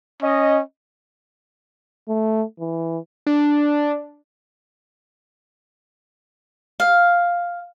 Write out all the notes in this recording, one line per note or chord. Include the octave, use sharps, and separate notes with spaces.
C#4 D#5
A3
E3
D4
F5